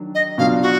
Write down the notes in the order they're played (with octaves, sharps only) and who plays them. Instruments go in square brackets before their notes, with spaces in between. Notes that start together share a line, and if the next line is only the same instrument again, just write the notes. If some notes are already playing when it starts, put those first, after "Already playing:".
Already playing: [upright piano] D#3 F#3 D4
[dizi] D#5
[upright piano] B2 F#3 D4 F4 [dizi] F5
[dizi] F#4